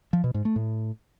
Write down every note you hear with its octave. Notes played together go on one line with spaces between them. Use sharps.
F3
B2
G#2
A3
A2